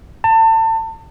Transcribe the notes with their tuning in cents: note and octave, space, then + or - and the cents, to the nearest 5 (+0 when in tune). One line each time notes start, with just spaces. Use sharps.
A5 +30